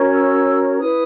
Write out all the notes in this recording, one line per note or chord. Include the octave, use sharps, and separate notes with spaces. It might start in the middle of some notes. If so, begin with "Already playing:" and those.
Already playing: C#4 F#4 A#4 C#5
E6
E4 B4 D#6